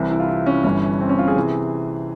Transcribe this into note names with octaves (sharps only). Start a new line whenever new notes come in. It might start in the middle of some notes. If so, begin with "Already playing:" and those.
Already playing: C2 C3 E3
E4
F4
E4
C#4
G1 G2 E3 C#4
C4
C#4
F4
G#4
C3 E3